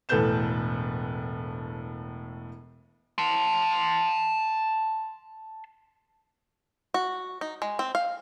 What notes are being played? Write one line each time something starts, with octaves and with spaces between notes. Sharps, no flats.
E1 A2 A4 B4 G6 E7
A5 C6
F#4
D#4
G#3
C4
F5